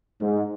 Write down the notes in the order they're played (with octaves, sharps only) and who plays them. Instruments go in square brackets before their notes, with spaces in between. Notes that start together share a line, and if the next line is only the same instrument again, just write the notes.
[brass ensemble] G#2